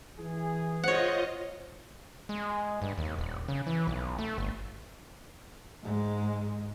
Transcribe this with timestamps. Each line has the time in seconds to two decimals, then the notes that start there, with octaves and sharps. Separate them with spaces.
0.19 E3 G#4
0.84 F4 C5 C#5 D#5 F#5
2.29 G#3
2.82 G2
2.98 D#2
3.19 D#1
3.48 C#3
3.67 E3
3.87 B1
4.19 A3
4.38 G1
5.82 G#2 G#3